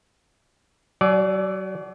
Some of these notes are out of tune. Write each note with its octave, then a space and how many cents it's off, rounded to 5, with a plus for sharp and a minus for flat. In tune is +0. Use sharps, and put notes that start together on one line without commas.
F#3 +30 D5 -5 G#5 +45